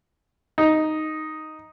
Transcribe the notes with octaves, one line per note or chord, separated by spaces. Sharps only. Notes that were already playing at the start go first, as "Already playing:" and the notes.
D#4